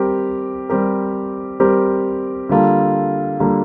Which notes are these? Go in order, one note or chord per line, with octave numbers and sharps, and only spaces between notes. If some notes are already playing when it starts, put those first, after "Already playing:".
Already playing: G3 C4 G4 A#4
G3 C4 G4 A#4
G3 C4 G4 A#4
D3 G3 A#3 F4 A4
D3 G3 A#3 F4 A4